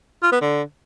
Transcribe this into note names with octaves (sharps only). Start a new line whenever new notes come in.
F4
B3
D3